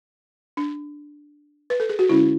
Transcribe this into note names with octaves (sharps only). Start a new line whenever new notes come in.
D4
B4
A4
G#4
F#4
D3 G#3 C#4 E4